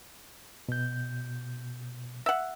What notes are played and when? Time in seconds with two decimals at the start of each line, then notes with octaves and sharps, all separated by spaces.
0.69 B2 G6
2.26 E5 F#5